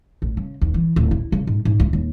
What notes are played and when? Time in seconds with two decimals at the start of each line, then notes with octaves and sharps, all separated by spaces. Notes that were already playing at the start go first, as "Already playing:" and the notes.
0.22 A1
0.37 C#3
0.61 D#2
0.74 E3
0.96 D1
1.11 E4
1.32 C#3
1.47 G#2
1.65 G#2
1.80 C#2
1.93 D#2